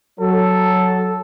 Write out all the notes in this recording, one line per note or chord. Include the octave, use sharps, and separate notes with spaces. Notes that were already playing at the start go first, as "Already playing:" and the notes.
F#3 A4